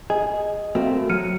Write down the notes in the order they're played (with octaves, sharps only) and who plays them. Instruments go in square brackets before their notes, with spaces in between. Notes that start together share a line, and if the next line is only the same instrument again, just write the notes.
[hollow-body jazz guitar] G#4 [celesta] D#5
[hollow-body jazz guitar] A3 A#3 C4 [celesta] F#4
[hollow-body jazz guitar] F#3 [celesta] F6 C#7 D#7